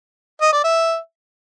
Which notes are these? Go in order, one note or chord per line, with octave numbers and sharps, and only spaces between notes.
D#5
D5
E5